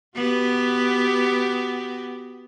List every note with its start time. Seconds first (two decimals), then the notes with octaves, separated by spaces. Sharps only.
0.16 B3 F#4 G4